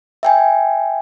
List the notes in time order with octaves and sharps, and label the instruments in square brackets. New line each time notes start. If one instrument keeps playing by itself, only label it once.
[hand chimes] E5 G5 G#5